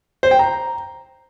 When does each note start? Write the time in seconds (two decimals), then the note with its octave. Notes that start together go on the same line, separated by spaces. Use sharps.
0.23 C5
0.31 G5
0.39 A#5